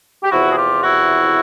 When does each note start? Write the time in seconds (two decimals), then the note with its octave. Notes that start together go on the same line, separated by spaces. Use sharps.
0.23 G4
0.31 E2 C3 F3 E4 F#4
0.51 G#4
0.57 F4 G4
0.83 E4 F#4